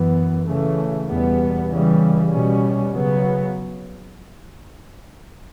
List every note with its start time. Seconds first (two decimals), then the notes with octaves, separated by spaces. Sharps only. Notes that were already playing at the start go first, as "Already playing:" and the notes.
Already playing: F#2 E3 B3
0.45 C#3 E3 A3
1.08 E2 B2 G3 B3
1.69 C#3 E3 G3
2.31 B2 G3 C#4
2.93 C#3 F#3 B3